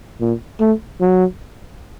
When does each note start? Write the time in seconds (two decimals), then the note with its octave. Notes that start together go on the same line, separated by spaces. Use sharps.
0.21 A#2
0.60 A3
1.00 F#3